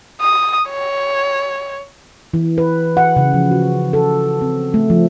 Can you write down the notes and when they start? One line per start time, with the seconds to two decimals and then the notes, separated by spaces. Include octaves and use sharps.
0.21 D#6
0.71 C#5
2.34 E3
2.58 B4
2.97 F#5
3.16 C#3
3.34 F3
3.51 F#4
3.93 A4
4.42 C4
4.74 A3
4.90 F3